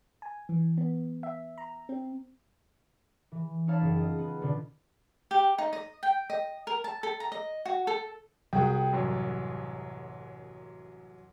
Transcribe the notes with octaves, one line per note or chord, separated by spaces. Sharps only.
G#5
E3
B3
E5
A#5
C4
E3
D#4 E4 C#5 F5 A5
F#1
F4 D#5
B3
B2 D3 B3
G4
D#4
D#5
G5
D#5
A#4
A5
A4
A#5
D#5
F#4
A4
C2 F#4 G#4 G5
A1 F#2 F#3